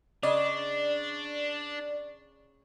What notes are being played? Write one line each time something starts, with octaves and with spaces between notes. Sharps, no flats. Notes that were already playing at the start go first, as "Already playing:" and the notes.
C#3 D4 D5 D#5